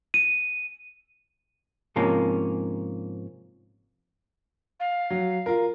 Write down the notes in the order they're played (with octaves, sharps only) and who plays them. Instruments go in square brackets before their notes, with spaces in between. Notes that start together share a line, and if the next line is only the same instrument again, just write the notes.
[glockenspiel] D#7
[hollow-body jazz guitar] G#2 C3 F3 A#3 C#4
[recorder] F5
[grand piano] F#3
F4 A#4